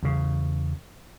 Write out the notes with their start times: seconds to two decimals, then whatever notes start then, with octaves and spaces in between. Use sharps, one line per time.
0.03 E2 C#3